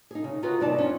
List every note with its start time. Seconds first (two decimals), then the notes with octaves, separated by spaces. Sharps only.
0.11 D#4 G#4
0.24 C#3
0.43 D#4 F4 F#4 G#4 B4
0.60 E2 C3 B3 D#4 D5 A5
0.78 F2 C#4 D4